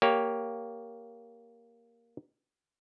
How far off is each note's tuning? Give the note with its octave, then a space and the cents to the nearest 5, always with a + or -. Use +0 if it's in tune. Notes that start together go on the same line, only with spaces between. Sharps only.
A#3 +0 G4 +0 C#5 +15